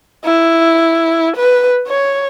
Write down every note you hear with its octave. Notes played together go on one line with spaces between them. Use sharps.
E4
B4
C#5